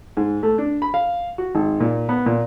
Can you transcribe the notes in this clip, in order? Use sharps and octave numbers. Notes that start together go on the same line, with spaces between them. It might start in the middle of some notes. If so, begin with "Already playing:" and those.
G#2
A3
D4
B5
F5
F#4
G#1
A#2
B3
A#2